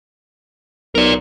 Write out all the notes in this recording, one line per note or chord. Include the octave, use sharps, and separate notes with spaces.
B1 A#4 D5